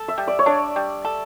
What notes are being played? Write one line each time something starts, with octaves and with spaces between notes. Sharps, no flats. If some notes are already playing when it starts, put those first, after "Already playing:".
Already playing: A4
E5
G3
D5
C#5
D4 D5
G3
A4